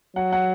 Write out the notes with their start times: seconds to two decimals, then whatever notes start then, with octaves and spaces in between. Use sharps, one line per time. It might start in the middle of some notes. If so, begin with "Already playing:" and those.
0.16 F#3 F#5
0.32 F#5